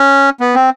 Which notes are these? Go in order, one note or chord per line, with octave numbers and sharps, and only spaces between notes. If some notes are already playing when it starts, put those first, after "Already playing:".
Already playing: C#4
B3
C4